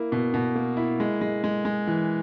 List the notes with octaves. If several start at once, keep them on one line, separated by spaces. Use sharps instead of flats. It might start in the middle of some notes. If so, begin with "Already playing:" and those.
Already playing: A#3 E4
B2
B2
A#3
E4
G#3
G#3
G#3
G#3
E3